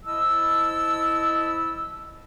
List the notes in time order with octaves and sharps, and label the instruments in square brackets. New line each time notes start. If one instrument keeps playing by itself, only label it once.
[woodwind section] F3 E4 D#5 A5 E6